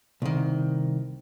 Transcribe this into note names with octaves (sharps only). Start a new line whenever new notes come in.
C2 D#3